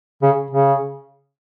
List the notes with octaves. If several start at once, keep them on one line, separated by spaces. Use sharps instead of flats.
C#3
C#3